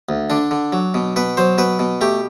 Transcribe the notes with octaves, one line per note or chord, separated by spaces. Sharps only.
D2
D3 D4
D3
F#3
B2
B2 B4
F#3 C5
B2 B4
B2
A3 G4